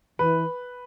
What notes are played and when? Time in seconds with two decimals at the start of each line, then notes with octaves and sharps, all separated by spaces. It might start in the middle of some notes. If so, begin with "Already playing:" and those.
0.19 E3 B4